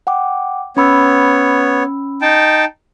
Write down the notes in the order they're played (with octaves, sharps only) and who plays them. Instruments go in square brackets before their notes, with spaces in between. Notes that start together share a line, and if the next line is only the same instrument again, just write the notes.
[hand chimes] F#5 G5 D6
[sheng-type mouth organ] B3 C#5 [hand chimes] C#4 B5 E6
[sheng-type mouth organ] D#4 G5 A5